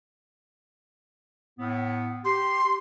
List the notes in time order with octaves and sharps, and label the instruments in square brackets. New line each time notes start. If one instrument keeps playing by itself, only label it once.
[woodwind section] A2 B3
[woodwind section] G4 [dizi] C6